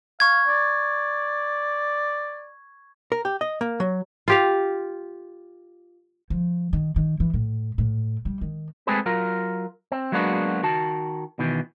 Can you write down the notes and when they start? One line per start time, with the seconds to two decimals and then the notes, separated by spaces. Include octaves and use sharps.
0.20 F5 C#6 G#6
0.47 D5
3.12 A#4
3.25 G4
3.41 D#5
3.61 A#3
3.80 F#3
4.28 F4 G4 F5
6.30 F3
6.73 D#3
6.96 D#3
7.20 E3
7.34 A2
7.78 A2
8.25 G3
8.41 D#3
8.87 G#3 A3 C4 G#4 A4 B4
9.06 F#3 F4 A#4
9.92 C4
10.12 F#3 G#3 A#3 B3 D4 F#4
10.63 D#3 F#4 A5
11.39 B2 D#3 E3